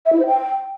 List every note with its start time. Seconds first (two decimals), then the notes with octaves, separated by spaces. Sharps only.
0.06 E5
0.13 E4
0.20 C5
0.27 G5